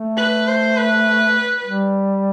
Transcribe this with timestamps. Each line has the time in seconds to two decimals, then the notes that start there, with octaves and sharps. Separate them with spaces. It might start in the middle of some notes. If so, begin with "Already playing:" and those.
Already playing: A3
0.18 B4
0.48 C5
0.77 B4
1.64 G3